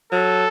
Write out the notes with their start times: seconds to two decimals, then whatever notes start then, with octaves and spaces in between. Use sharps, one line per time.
0.12 F#3 A4